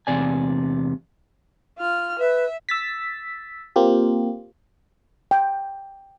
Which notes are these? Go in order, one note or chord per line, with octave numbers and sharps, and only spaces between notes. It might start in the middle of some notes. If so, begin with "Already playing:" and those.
E2 C3 D5 G#5
F4 F6
B4 E5
E6 A6 B6
A#3 C4 F4 G4
G5